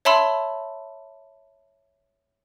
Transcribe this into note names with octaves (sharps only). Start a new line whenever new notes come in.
C#5 E5 A5 B5 C6 E6